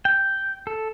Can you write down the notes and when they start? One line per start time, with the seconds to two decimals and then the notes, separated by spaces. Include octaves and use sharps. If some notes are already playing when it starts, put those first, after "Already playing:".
0.05 G5
0.67 A4